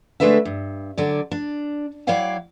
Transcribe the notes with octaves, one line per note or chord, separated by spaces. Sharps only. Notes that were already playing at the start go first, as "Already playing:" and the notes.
D3 G#3 A3 D4 B4 E5
G2
D3 F#3 D5
D4
F#3 E4 C#5 D5 F5 G5